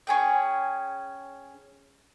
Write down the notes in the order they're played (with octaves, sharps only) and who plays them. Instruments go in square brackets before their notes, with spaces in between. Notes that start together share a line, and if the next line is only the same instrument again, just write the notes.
[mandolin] C#4 G#4 G5